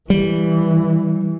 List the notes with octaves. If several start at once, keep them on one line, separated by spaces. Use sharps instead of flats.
E3 G3